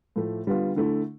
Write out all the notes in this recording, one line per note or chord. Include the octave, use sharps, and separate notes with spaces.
A2 F3 A3
D3 G3 B3 F4
D3 A3 E4